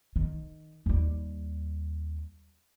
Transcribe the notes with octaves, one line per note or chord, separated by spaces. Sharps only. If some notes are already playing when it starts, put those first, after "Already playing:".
D#3
D#2 G3